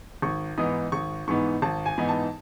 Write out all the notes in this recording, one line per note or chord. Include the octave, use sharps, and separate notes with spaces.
G#1 C#6
G#2 E3 B3 D#4 D#6
G#1 C#6
G#2 E3 B3 D#4 C#6
G#1 A5
G#5
G#2 E3 B3 D#4
A5